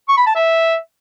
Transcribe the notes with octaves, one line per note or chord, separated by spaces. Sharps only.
C#6
B5
A5
E5